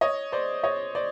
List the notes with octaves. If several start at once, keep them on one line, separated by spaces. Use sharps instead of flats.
C#5 D#5
C5 D5
C#5 D#5
C5 D5